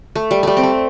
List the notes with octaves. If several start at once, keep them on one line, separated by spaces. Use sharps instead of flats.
A3
G3
G3 A3
C4
A3